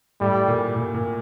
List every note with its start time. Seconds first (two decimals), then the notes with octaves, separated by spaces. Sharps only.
0.20 A2 G3
0.48 A#2
0.76 A#2
0.94 A#2